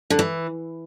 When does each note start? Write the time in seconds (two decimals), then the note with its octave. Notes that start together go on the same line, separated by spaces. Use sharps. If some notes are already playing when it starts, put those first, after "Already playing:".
0.10 D3
0.19 E3